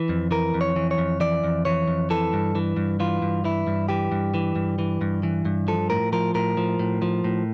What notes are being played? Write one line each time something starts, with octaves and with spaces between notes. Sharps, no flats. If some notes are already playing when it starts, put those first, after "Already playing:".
Already playing: E3
F2
E3 A#4
F2
C#5
E3
C#5
F2
E3 D5
F2
E3 C#5
F2
E3 A4
G2
E3
G2
E3 F4
G2
E3 E4
G2
E3 G4
G2
E3
G2
E3
G2
E3
G2
F3 A4
A2 A#4
F3 A#4
A2 A#4
F3
A2
F3
A2